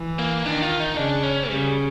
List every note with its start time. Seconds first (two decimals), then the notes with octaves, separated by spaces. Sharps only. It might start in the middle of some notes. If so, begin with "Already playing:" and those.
Already playing: E3
0.19 A#3
0.46 D#3 D4
0.62 F4
0.80 D#4
0.97 C#3 D4
1.23 C#4
1.49 C#3 G3